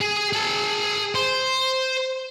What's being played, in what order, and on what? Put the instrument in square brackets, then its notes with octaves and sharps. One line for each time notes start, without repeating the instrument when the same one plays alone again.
[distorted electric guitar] G#4
G#4 A5
C5